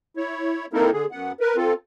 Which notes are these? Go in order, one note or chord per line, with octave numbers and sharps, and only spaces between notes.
E4 C#5
A#3 C4 D#4 E4 A4 A#4
D3 G#4
F#2 B3 F#5
A#4 B4
C4 F4 A4